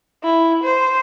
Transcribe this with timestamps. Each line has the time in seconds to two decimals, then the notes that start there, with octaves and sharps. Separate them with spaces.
0.24 E4
0.63 C5